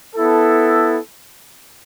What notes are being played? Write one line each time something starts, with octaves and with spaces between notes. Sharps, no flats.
B3 E4 A4